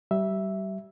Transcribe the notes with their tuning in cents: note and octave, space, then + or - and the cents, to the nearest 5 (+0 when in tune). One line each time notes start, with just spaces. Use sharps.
G3 -25 E5 +0